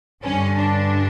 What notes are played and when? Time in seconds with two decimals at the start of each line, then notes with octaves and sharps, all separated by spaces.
0.24 G2 D3 C#4
0.56 D4